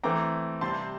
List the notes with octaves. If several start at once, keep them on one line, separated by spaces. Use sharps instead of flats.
E3 A3 C4 A#5 D6
C3 G3 C4 A5 C6